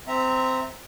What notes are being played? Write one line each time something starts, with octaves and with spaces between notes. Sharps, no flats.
C4 E5 A#5